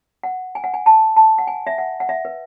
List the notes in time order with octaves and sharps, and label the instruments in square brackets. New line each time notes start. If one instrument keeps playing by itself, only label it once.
[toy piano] F#5
G#5
F#5
G#5
A5
A5
F#5
G#5
E5
F#5
F#5
E5
B4